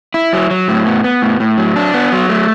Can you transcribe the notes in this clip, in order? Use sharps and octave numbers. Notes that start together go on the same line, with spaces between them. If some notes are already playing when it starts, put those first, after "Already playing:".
E4
F#3
F#3
A2
B3
B3
A2
A2
F#3
D4
B3
F#3
A3